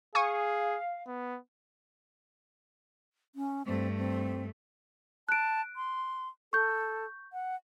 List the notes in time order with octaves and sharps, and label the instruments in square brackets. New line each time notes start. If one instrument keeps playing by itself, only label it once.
[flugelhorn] G#4 [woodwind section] F5 [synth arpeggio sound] G#5 C#6 D#6
[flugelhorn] B3
[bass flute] C#4
[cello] G2 A3 [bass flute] C4
[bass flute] C4
[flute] A5 [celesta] F#6 D7
[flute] C6
[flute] A4 [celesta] C#6 G6
[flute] F#5